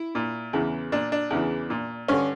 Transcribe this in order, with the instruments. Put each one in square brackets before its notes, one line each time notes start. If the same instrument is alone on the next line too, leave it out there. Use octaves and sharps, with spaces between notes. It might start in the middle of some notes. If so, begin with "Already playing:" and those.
Already playing: [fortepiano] E4
A#2
E2 C#3 E3
A#2 D4
D4
E2 C#3 E3
A#2
G2 D3 C#4